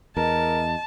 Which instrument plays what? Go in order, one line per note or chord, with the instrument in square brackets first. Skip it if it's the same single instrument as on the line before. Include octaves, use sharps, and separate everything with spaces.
[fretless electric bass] E2 [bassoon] A#4 [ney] D#5 [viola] A5